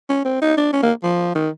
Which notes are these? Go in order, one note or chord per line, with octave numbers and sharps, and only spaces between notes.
C#4
C4
D#4
D4
C#4
A#3
F3
D#3